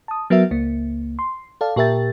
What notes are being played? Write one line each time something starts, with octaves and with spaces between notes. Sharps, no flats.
A5 D#6
F#3 B3 F#4 A#4 E5
C#2 A#3
C6
A4 D5 F5 A5
A#2 G4 A#4 E5 G5 A6